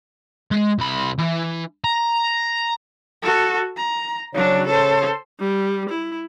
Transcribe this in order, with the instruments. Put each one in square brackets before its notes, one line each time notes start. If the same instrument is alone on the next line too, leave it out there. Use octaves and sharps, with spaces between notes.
[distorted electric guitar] G#3
C2 B5
E3
A#5
[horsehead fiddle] F#4 A4
A#5
[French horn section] C#3 C#5 [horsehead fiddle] F#3 D4
[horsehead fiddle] A4 C5
[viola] G3
E4